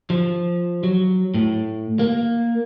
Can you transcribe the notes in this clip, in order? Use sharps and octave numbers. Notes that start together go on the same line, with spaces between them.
F3
F#3
A2
A#3